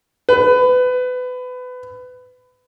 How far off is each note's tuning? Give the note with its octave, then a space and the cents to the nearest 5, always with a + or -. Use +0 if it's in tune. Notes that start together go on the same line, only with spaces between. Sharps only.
B4 +25